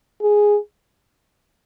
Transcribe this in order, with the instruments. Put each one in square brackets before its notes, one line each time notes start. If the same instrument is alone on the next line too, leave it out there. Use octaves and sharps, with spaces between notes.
[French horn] G#4